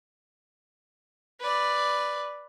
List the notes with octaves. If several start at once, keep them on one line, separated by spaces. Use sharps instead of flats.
B4 D5